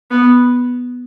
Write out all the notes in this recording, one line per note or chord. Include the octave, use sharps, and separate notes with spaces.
B3